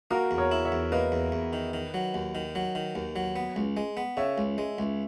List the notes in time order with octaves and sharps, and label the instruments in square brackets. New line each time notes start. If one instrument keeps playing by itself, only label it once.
[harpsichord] A#3 [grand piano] F#4 A#4
[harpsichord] E2
[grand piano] A#4 C#5
[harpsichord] E4
[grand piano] C#5 E5
[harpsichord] E2
[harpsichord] A#3 [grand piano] B4 D#5
[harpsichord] E2
E2
D#3
D#3
F#3
D#2
D#3
F#3
D#3
D#2
F#3
B3
C#2
G#3
B3
[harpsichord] C#3 [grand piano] C#5 E5
[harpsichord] C#2
G#3
C#2